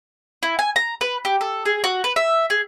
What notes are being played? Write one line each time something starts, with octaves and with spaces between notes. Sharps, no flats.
E4
G#5
A#5
B4
G4
A4
G#4
F#4
B4
E5
G#4